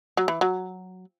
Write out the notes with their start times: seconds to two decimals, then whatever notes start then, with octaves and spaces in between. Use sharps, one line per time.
0.17 F#3
0.28 E3
0.41 F#3